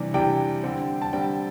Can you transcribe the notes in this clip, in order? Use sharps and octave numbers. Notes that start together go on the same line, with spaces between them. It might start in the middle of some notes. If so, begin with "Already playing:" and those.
Already playing: C3 E3 G3 D4
C3 E3 G3 D4 G5
D3 G3 C4
A5
D3 G3 C4 G5